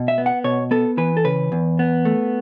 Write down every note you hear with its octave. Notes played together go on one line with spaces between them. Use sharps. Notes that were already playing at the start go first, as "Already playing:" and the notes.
Already playing: B2
E5
B3
F#5
B2 C#5
B3 A4
E3 B4
A4
C#3 B4
E2
B3
A3